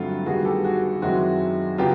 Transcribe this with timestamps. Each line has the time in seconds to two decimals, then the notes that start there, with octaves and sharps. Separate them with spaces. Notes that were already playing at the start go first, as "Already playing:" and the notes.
Already playing: G2 D3 F#3 A3 C4 F4
0.26 G2 D#3 G3 B3 F#4 G#4
0.45 G4 A4
0.64 F#4 G#4
1.02 F#2 D#3 G#3 C4 E4 F#4
1.78 C#3 F#3 B3 F4 G4